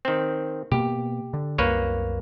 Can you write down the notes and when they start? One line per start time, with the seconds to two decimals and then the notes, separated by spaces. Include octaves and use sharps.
0.05 D#3 C4
0.72 B2 A#3 G4
1.34 D3
1.58 C2 F#2 A#3 B4 C#5